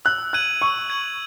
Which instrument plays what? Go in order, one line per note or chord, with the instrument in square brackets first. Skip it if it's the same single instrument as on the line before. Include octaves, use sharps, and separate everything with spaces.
[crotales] E6 [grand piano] F#6
[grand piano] F#6 [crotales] G#6 D#7 F#7
[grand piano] C#6 [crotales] E6
[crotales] G#6 D#7 F#7